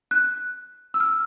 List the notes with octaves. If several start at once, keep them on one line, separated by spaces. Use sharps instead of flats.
F#6
E6
F6